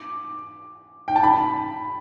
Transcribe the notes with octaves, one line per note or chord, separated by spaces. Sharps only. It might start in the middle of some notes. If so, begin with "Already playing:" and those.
Already playing: D6
G5
A5
B5